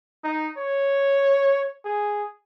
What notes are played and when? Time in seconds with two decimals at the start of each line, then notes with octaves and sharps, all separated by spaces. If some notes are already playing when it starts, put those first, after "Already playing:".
0.24 D#4
0.58 C#5
1.85 G#4